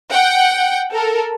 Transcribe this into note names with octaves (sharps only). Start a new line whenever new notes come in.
F#5 G5
A4 A#4